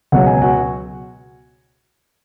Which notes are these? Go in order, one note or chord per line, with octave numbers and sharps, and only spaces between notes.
C#2 B2 F#3 F#5
G#5
F#4